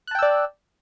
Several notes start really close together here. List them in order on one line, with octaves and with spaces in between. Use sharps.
F#6 A5 G5 E6 D5